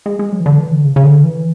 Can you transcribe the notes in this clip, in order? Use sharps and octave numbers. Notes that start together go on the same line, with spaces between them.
G#3
G#3
F#3
E3
D3
E3
D3
C#3
C#3
D3
E3